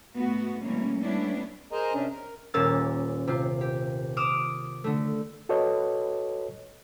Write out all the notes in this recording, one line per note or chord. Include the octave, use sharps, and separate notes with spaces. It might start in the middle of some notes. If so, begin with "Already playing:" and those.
G#2 A3 B3 F#4
B2 E3 G3 A3 A#3 C#4
G3 A3 B3 C#4 D4 E4
G#4 A#4 C5 D#5 G#5 A#5
C3 C#4 D4
A#4
D#1 A#2 A#3 C#4 E6 A6
C3 F4
G4
D6 D#6 F6 D7 E7
D3 A3
F#4 A4 B4 C#5 D#5